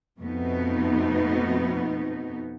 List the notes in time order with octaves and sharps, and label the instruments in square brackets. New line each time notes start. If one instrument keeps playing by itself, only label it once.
[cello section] F2 B2 A3 B3 D#4